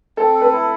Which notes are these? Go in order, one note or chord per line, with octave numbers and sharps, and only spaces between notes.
C4 A4
A4
B4
E4